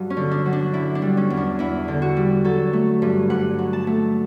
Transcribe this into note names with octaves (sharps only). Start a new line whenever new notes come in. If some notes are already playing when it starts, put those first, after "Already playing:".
Already playing: G2 F#3
C#4
D3
D4
F#3
D4
D3 E4
D4
G3
C#4
E2
D4
E2 E4
D3
F#4
G3
F#3 A4
A3
G2
G2 F#5
F#3
A5
A3